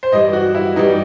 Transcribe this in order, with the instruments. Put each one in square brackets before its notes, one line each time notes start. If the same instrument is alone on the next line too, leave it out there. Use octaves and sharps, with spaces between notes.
[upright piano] C5
[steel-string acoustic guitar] G2 E3 G3 [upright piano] D#5
[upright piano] F#4
E4
[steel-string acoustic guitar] G2 E3 G3 [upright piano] D#4